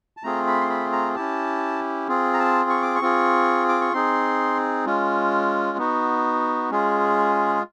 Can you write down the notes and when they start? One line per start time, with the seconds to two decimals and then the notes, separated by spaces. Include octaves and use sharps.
0.17 A5
0.23 A3 C4 F4 G#4 A#5
0.47 B5
0.61 C6
0.70 B5
0.92 A#5
1.15 C#4 E4 G4 A5
2.09 C4 F4 G#4
2.33 A#5
2.39 A5
2.70 C#6
2.82 D6
2.95 C#6
3.01 C4 F4 G#4
3.69 D6
3.81 C#6
3.93 C4 D#4 G#4 C6
4.86 G#3 C#4 F4
5.78 B3 D#4 F#4
6.70 G#3 C#4 F4 G#4